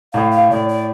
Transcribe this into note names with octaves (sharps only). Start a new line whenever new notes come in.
A2 F5
F5
A2 D5
D5